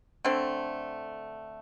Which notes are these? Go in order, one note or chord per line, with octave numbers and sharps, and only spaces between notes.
D3 A3 C4